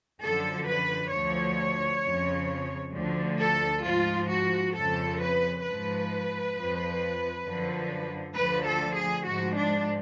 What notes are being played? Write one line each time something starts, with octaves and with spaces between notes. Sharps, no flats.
F#2 D3 F3 A4
B4
D2 D3 F3 C#5
F2 C#3 F3
D2 D3 F3
A4
G#2 F3 F4
F#4
F2 C#3 F3 A4
B4
G#2 F3 B4
F3
F2
F#2 D3 F3
D2 D3 F3 B4
A4
G#4
G#2 F3 F#4
D4